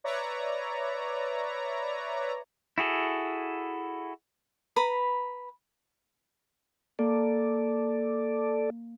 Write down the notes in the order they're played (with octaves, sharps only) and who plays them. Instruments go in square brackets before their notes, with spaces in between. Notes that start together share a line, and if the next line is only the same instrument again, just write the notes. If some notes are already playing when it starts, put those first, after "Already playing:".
[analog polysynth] B4 C#5 D5 E5 A#5
[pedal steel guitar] E4 F#4 G#4 A4
[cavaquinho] B4 A#5 B5
[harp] A#3 [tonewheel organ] A4 D5